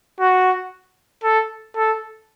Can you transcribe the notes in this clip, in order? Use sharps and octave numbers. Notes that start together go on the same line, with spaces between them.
F#4
A4
A4